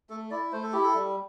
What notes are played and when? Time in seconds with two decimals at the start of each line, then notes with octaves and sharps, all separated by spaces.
0.10 A3 A4
0.31 E4 D5
0.52 A3 C5
0.63 A4
0.73 E4 G4
0.83 A4
0.95 G3